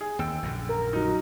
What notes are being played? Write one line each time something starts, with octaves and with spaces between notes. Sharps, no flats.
G#4
D#2 G5 E6
A#1 F#2 D3
A#4
F#3 D#4